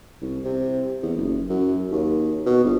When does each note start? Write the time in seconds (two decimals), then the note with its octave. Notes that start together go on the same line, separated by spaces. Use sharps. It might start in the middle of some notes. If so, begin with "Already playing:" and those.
0.22 C2
0.44 C3
1.03 E2
1.16 F#1
1.50 F#2
1.91 D#2
2.46 B2
2.64 G1